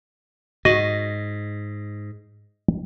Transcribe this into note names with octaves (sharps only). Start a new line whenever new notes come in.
G#2 F#4 D#5